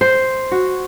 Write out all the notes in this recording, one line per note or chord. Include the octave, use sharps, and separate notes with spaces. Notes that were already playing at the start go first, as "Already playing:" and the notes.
C5
F#4